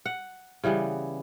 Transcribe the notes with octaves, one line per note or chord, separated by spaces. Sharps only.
F#5
C#3 E3 G3 B3